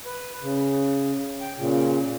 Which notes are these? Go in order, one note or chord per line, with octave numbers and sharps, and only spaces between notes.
B4
C#3
G5
A#2 C#3